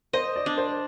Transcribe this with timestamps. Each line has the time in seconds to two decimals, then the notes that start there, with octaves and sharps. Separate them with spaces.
0.13 C5 D#5
0.36 D5
0.46 D4
0.58 C5